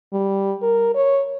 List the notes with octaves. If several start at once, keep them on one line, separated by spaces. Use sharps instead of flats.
G3
A#4
C#5